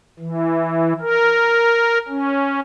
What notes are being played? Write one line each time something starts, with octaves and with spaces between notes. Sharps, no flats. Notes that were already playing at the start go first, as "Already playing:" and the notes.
E3
A#4
C#4